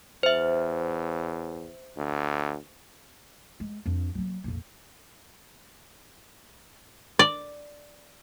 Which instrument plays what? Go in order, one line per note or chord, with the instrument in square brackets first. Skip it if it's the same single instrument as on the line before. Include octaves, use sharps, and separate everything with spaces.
[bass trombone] E2 [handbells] C5 E5
[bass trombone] D2
[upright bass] G#3
F2 D4
F#3 A#3
A#1 F2
[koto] D5